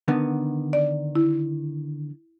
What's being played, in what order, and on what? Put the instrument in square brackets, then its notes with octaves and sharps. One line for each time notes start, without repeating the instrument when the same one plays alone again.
[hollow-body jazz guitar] D3 D#3 B3
[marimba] D5
E4